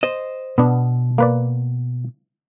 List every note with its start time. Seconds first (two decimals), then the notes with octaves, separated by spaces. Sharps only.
0.03 C5 D#5
0.58 B2 B3 D4
1.18 A#3 B4 D5